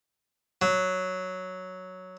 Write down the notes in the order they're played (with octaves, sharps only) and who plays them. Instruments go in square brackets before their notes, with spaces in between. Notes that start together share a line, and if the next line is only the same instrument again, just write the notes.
[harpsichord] F#3